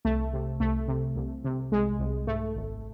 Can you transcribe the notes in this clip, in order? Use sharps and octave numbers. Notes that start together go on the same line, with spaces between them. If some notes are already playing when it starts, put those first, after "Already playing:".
C2 A3
C3
C2 A3
C3
C2
C3
C2 G#3
C2
G#2 A3
G#1